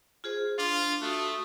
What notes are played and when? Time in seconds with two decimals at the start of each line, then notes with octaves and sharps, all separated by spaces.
0.24 F4 G#4 C5
0.59 D4 F4
1.02 A3 F#4 D#6